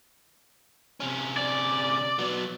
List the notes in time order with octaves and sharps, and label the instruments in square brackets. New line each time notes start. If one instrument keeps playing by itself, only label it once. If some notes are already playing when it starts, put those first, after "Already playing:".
[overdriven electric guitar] C3 C#4
[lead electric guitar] D5
[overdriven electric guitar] F#3 B3